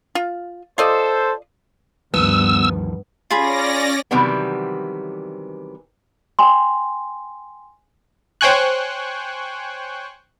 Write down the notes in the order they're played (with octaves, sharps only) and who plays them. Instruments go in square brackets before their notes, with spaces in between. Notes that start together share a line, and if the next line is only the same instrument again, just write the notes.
[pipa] F4
[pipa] F4 D5 D#5 [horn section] A4 C5
[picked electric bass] D2 D#3 F3 [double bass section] G2 [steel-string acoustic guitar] B3 [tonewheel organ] E6
[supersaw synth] C#4 D5 A#6 [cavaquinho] F4 G#4 B5
[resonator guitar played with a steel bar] C3 D#3 E3 F#3 G3 B3
[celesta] G5 G#5 C6
[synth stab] C5 C#5 G5 G#5 C#6 F#6